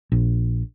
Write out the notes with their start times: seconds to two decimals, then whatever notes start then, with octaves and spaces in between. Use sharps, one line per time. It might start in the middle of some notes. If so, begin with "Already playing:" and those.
0.12 A#1